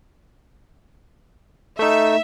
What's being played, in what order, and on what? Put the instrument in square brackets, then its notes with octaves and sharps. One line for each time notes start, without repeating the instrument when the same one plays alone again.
[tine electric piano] A3 D#4 [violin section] E5